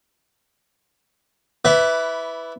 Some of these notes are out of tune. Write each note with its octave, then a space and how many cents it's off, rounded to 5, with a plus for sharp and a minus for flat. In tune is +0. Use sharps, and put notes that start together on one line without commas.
E4 -10 B4 +10 D5 -25